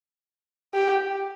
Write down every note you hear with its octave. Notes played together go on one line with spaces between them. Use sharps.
G4